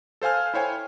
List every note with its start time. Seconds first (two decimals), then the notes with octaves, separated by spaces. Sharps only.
0.22 A4 C5 F5 G#5 F6
0.54 E4 C5 C#5 G5 G#5